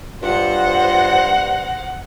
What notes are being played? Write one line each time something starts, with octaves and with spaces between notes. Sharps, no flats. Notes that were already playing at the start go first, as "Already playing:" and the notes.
G2 F#3 D4 F4 C5 F#5 A#6